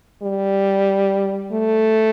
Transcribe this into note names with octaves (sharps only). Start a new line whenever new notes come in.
G3
A3